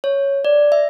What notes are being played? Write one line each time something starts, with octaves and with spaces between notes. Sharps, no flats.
C#5
D5
E5